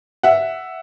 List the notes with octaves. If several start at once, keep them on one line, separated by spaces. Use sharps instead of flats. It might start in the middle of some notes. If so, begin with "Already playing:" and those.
E5 F#5